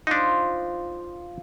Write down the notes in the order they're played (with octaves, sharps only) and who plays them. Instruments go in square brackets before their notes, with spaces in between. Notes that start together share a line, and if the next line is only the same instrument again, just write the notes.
[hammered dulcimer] F3 F4 [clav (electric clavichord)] D4 D#4